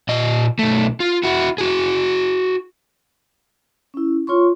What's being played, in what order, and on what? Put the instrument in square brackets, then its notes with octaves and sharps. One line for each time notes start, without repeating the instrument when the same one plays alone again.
[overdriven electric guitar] A#2 D#5
B1 A3
F4
E4 F#4
F#4 G#4
[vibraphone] C#4 E4
F4 C#5 C6 C#6